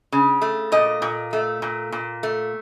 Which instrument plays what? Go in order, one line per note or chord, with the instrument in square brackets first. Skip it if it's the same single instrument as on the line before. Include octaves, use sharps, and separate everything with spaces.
[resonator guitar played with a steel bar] C#3
A3
A#2 D#5
A#2
A3
A#2
A#2
A3